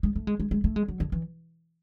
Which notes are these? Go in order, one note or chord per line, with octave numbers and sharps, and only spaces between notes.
G#3
A3
G#3
G#3
G#3
A3
G#3
F#3
D3
E3